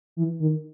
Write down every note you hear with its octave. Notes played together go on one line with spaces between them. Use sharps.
E3
D#3